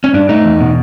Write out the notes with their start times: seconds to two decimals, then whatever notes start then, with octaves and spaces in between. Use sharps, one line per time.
0.04 C#4
0.14 G2 D4
0.29 A3 D#4
0.45 E2
0.60 B2